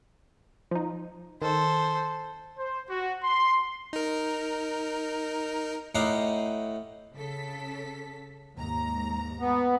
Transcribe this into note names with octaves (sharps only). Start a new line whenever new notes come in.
F3 D#4
D#3 A4 C5
C5
F#4
C6
D#4 A#4
A2 D#4 G4 D#5 F5 F#5
C#3 A4 B6
D#2 G#2 A#5
B3